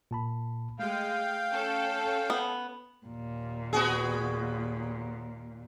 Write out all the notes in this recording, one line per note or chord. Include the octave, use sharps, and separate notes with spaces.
A#2 A5 B5
G#3 A3 F5 G5
C#4 A4
B3
D#2 A#2
B3 F#4 G#4